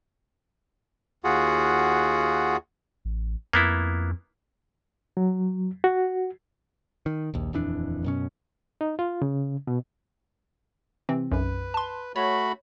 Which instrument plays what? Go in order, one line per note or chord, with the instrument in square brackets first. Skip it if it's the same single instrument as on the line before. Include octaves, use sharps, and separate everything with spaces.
[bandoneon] D#2 F4 F#4 G#4 F#5
[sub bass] A1
[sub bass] F2 [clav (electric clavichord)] A#3 B3 E4
[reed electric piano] F#3
F#4
[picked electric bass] D#3
A#1 D#2
D#1 F2 E3 D4
F#2 B2 C#4
[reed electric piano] D#4
F4
C#3
B2
[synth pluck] C3 E3 C4
[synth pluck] B1 F#2 [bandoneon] B4
[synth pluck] A5 C6
[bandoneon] A3 F#4 B5 [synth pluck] C#5